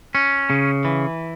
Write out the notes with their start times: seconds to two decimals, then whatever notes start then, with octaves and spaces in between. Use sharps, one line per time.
0.15 C#4
0.50 C#3
0.85 E3